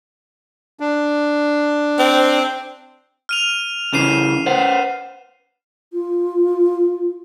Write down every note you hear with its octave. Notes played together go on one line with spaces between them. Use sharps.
D4
C4
F6 D#7 F7
C#3 E3 C7 D#7 E7
B4 C5 F#5
F4